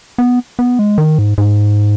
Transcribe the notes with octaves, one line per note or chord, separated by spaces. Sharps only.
B3
B3
G#3
D#3
G#2
G#2